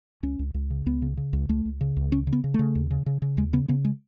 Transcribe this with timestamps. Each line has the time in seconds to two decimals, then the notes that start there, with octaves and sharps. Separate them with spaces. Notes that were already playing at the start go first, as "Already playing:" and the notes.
0.23 C#2 C#4
0.39 C#2
0.54 C#2
0.70 C#3
0.86 C#2 B3
1.02 C#3
1.17 C#3
1.33 C#2
1.49 C#2 A3
1.65 C#2
1.81 C#3
1.97 C#2
2.12 C#3 C#4
2.27 C#3
2.33 B3
2.44 C#3
2.54 C#3 A3
2.75 D#2
2.91 C#3
3.06 C#3
3.22 C#3
3.37 D#2 G#3
3.53 C#3 B3
3.68 C#3 B3
3.85 G#3